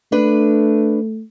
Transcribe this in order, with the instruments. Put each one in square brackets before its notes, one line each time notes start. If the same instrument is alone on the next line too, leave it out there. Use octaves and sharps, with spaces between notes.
[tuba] A3 [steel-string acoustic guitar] D4 B4